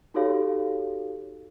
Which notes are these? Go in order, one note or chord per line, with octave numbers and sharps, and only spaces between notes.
D#4 F#4 G4 A4 C#5 F5